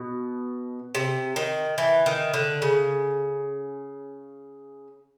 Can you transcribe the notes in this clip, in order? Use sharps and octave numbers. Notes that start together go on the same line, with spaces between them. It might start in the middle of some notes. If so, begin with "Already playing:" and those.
Already playing: B2
C3
D#3
E3
D#3
D3
C#3